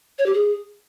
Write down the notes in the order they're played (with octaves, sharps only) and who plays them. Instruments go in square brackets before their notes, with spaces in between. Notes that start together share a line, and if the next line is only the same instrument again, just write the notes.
[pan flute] C#5
G4
G#4